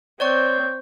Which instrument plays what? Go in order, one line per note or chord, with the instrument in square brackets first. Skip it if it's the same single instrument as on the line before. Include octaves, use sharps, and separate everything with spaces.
[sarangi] C4 [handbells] C#5 D5 C#6 [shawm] G5